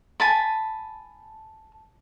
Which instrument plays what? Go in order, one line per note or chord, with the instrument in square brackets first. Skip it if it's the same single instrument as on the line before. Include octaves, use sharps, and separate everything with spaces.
[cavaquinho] G#5 A5 B5